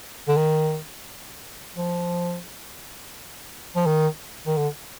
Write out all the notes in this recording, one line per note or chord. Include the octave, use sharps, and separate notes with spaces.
D3
D#3
F3
F3
D#3
D#3
D3